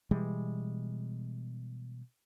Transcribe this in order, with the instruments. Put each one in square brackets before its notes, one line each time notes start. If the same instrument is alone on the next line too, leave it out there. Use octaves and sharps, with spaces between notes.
[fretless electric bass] B2 E3 G3 G#3